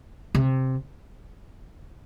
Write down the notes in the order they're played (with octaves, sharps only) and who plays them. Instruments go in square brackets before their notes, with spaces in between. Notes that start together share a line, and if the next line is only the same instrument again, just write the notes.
[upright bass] C3